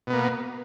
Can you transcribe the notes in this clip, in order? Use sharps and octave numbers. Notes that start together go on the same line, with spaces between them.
B2 A#3 B3